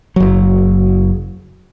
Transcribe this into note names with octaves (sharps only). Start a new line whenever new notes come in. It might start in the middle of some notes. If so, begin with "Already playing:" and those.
F#1 F#3